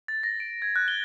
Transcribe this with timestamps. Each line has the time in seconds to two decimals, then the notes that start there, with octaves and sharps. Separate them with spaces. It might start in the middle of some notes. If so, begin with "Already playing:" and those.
0.08 A6
0.23 A#6
0.40 D7
0.62 G#6
0.76 F#6
0.88 G7